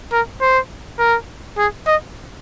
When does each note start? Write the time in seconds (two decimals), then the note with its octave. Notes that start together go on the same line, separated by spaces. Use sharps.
0.12 A#4
0.41 C5
0.99 A#4
1.58 G#4
1.87 D#5